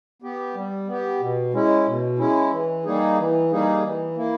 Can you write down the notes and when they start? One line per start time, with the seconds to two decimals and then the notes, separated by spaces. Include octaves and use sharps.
0.22 B3 G4
0.54 G3
0.87 B3 G4
1.20 B2
1.54 G#3 C#4 E4
1.86 B2
2.19 G#3 C#4 E4
2.52 E3
2.85 G3 A#3 D#4 G#4
3.18 E3
3.51 G3 A#3 D#4 G#4
3.84 E3
4.17 A#3 E4